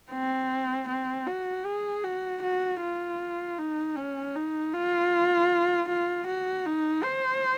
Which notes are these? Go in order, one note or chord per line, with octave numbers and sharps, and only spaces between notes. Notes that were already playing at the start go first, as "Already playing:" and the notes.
C4
C4
F#4
G#4
F#4
F#4
F4
D#4
C#4
D#4
F4
F4
F#4
D#4
C5